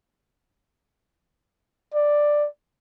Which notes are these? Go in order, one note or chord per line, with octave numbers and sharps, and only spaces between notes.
D5